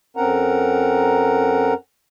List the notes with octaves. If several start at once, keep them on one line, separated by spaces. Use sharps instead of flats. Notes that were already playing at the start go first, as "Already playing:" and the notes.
F2 C4 C#4 A#4 F#5 A#5